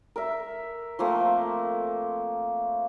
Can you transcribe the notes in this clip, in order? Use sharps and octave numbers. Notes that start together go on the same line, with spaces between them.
A#4 E5
F3 A3 A#3 C4